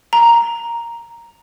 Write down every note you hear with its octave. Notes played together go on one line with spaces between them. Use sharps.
A#5